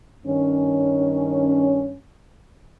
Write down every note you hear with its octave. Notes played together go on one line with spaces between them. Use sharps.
G2 D#3 C#4